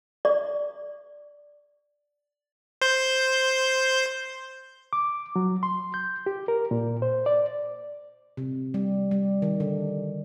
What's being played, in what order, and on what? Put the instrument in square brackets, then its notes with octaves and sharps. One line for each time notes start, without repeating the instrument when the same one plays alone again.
[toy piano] D5
[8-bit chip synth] C5 G6
[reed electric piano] D6
F#3
C6
G6
G4
A#4
A#2
C5
D5
[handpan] C3
G3
G3
D#3
D3